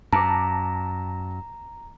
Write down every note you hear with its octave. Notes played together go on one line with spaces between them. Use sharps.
F#2 A5 A#5 D6